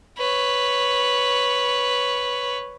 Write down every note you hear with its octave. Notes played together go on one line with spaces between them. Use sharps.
B4 C#5